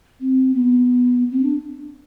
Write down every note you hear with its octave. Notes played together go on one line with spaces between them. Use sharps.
C4
B3
C4
D4